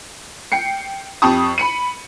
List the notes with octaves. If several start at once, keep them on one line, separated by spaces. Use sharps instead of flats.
G5 C7 C#7
F2 G4 A5 C#6 D#6
B5 C#7 D#7